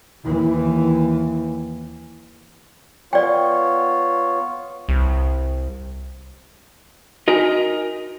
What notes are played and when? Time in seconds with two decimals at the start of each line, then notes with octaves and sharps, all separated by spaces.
0.25 D#2 E3
3.13 B3 F4 C#5 D5 G5
4.89 C2
7.28 D#4 F#4 A#4 D#5 G#5